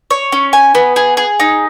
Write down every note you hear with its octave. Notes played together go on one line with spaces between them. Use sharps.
C#5
C#4
G#5
B3
G#4
G#4
D#4